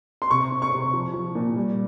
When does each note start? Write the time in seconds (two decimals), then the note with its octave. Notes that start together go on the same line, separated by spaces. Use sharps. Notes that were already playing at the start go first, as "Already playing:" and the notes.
0.22 C6
0.31 C3 C#6
0.52 C4
0.62 C#6
0.73 C3
0.93 F3
1.14 F3
1.35 A#2
1.56 G3